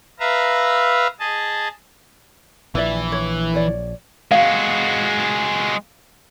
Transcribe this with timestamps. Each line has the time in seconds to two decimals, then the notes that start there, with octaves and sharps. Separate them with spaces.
0.20 B4 E5 F5 A#5
1.20 G#4 D#5 A5
2.75 A#1 E3 E4 D5 E5
3.12 C#5
3.54 C#5 D5
4.32 G#3 F#4 F5